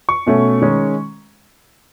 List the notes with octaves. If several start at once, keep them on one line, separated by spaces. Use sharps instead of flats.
C#6
B2 A3 C#4
D#3 G#3 C#4